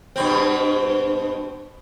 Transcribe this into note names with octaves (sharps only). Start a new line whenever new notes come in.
G2 B2 C4